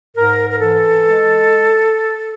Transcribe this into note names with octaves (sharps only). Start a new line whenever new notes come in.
G#2 A#4
A#4
E3 A4
G#3